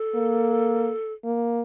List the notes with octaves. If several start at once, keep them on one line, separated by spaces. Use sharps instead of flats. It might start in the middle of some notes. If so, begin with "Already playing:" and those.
Already playing: A4
A#3
A#3